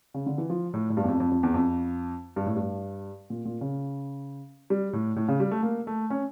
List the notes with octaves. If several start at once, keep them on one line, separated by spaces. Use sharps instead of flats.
C#3
D3
E3
F3
A2
A2
G2
E2
F2
F2
F2
E2
F2
G2
A2
G2
A#2
A#2
C#3
G3
A2
A2
C#3
G3
A3
A#3
A3
C#4